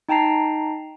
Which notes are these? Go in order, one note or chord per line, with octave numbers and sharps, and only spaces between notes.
D#4 G5 A5 A#5 C7